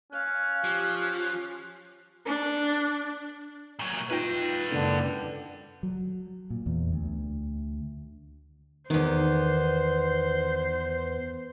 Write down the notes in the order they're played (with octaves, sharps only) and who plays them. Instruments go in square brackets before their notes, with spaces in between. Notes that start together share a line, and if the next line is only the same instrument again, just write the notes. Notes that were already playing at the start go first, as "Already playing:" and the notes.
[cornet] C#4 [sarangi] F5 [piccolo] F#6
[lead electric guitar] F3 [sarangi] G4
[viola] D4
[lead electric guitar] A#2 F#3
[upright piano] D#4 F4 A#6 [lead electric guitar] B4 G5
[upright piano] F#1 [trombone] D3
[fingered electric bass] F#3
A#2
E2
D2
[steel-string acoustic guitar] E2 B3 [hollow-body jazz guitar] D#3 [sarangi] C5